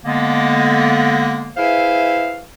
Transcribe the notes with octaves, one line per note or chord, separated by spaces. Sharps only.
D3 G#3 A#3 B3
E4 G#4 B4 C5 E5 F5